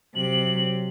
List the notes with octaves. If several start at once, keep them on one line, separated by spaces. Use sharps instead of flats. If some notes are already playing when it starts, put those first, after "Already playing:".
C3 F#3 F#7